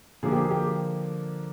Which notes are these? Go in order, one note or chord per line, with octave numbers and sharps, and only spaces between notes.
D3 F3 A#3 G#4
G4
G#4
G4